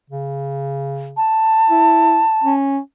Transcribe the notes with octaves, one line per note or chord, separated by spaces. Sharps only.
C#3
A5
E4
C#4